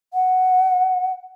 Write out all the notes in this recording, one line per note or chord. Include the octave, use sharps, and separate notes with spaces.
F#5